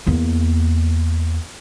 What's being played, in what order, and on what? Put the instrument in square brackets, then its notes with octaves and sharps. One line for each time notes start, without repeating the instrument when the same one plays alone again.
[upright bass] E2 A#3